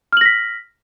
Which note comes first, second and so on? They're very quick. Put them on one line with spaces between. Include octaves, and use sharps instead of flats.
F6 F#7 A#6 B6